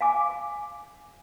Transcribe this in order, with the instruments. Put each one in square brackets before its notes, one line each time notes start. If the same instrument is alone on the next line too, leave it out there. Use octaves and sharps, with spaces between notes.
[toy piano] F5 G#5 D6